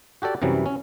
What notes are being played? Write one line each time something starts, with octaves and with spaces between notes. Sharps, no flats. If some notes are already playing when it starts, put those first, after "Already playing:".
F#4 G4 A4 D5
F#2 C3 E3 F#3 G3
C#4